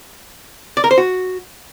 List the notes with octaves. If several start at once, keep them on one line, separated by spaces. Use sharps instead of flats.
D5
A#4
C5
F#4